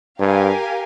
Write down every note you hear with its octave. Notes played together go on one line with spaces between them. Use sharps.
G2 G4 A#4 F5 G#5